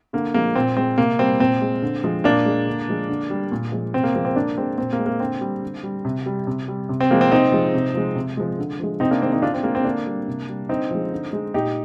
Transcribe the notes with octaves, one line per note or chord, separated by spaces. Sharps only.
D3 A#3
F3 G#3 A#3
A#2 C4
G#3 C4
C3 A#3
G3 C4
A#2 C4
G#3
D3
F3 G#3
A#2 A#3 D4
G#3
D3
F3 G#3
D3
G3
A#2
F3 G#3
C3 C4
A#3
F3 G#3 A#3
C4
D3 A#3 D4
G#3 C4
A#2 C4
A#3
G#3
A#3
D3 C4
G3
D3
G3
C3
G3
C3
G3
C3
C4
F3 G#3 A#3
C4
C3 C4 D#4
F3 G#3
C3
F3 G#3
C3
F3 G#3
D3
F3 G#3
C3 C4 D#4
A#3 D4
D#3 G#3 C4
C4 D#4
D3 D4 F4
C4
G#3 A#3
C4
D3 A#3 D4
G3
C3
G3
D3 C4 D#4
F3 G#3
D3
G#3
A#2 D#4 G4